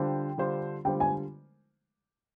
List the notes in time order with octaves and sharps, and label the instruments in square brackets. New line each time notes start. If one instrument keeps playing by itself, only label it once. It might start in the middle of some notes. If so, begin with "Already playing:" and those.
Already playing: [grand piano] D3 G3 D4 F4 C5 [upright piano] G5
[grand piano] D3 G3 D4 F4 C5
[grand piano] D3 G3 D4 F4 C5 [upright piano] G5
[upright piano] G#5